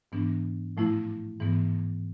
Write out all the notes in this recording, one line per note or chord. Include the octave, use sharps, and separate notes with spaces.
G#2 E3 B3 D4
A2 F3 A3 E4
G#2 E3 B3